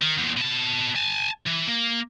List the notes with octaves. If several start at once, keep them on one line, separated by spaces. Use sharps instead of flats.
D#3
E2 A#2
B2 A5
G#5 A5
E3
A#3